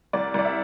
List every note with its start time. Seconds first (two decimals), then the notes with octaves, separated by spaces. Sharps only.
0.13 C2 D5
0.34 C2 D5
0.45 E5